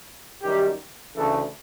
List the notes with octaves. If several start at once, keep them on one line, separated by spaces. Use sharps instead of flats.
F#2 D#3 G3 G4
D2 C#3 E3 A3 A4